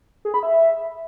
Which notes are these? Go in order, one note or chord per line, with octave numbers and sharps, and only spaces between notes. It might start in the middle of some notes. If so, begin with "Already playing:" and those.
G#4
B5
E5